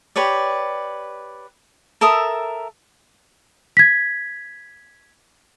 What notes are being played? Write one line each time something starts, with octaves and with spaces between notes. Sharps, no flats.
G4 B4 C#5 D5
A4 A#4 E5 D#6
G#6 B6